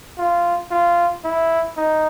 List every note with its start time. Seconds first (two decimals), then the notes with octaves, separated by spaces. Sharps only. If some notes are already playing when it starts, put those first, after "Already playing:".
0.18 F4
0.71 F4
1.24 E4
1.77 D#4